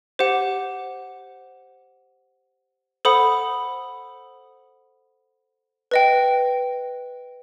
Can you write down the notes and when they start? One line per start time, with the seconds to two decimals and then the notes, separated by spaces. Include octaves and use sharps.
0.19 G4 C5 F#5
3.05 A4 C5 F#5 B5 D#6
5.91 B4 D#5 G5